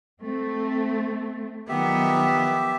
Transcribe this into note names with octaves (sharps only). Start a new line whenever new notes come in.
A3 C4
D#3 F3 F#3 B3 G4 E5